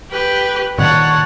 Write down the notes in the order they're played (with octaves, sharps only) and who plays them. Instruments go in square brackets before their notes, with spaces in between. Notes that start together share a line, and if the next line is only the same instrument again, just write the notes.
[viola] G4 B4
[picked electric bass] A#2 D#3 [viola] C#5 [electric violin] F#5 A5